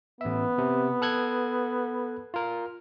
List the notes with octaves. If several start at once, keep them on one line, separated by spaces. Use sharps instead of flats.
A1 B3 E5
C3
A4 F#6 G#6
F4 A#4